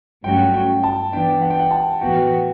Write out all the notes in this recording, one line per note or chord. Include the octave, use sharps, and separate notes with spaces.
G2 F#3 A3 C#4 F#4 G5
G5
A5
E3 B3 D4 G5
F#5
G5
F#5
A5
A2 E3 B3 F#4 G5